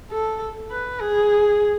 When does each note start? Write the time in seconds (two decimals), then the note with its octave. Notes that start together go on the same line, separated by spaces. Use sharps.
0.11 A4
0.71 B4
1.00 G#4